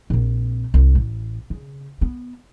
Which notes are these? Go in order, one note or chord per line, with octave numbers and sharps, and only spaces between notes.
A#1 C4
C2
A1
C#3
B3